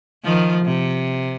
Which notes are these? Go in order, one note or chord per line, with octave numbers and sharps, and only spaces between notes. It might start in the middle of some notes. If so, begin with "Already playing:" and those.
D#3 F3
C3